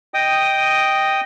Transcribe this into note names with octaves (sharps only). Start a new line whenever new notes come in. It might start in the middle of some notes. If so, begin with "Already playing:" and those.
D#5 G5 D#6